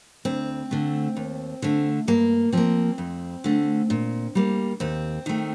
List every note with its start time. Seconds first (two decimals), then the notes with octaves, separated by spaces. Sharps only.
0.25 D2 C4
0.71 D3 A3
1.17 D#2
1.62 D3 A3
2.08 G2 A#3
2.53 F3 A#3 C4
2.98 F2
3.44 D3 A3
3.90 A#2
4.35 G3 A#3
4.80 D#2 C4
5.26 D#3 A3